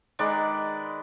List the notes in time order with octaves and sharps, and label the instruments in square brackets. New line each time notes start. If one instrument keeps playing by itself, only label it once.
[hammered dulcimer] D#3 G#3 B4 D5